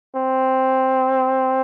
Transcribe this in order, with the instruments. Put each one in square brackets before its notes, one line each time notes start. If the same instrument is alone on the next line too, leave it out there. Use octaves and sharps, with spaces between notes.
[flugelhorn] C4